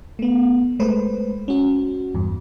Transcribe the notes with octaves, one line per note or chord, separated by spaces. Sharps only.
A3 B3
G#3 A3 B4 C5
C#4 F#4
E2 G2